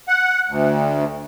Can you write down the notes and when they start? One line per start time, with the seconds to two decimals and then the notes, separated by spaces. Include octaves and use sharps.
0.08 F#5
0.50 D2